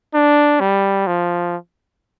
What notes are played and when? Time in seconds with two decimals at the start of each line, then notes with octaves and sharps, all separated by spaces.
0.14 D4
0.60 G3
1.07 F3